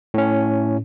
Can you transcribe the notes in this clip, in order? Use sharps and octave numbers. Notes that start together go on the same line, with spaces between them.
A2 C#4